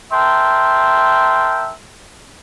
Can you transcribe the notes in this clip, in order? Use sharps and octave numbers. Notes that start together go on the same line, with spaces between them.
A#4 E5 G5 A5 C6